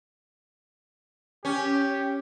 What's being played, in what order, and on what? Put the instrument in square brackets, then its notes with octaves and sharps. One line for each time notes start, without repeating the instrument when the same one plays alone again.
[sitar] C#4 [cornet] G4